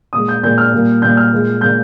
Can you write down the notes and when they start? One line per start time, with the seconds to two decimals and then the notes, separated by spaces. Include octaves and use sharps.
0.13 A#2 G#3 D#6
0.28 G6
0.43 A#2 G#3 G6
0.58 F6
0.73 A#2 G3 A#3
1.02 A#2 G3 A#3 G6
1.17 F6
1.32 A#2 G#3
1.61 A#2 G#3 G6